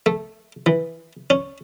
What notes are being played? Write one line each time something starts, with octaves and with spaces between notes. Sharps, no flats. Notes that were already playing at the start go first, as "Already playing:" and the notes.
A3
E3
C#4